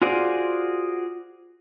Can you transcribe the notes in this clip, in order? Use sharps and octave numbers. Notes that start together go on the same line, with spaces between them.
F4 F#4 G#4 C5 D5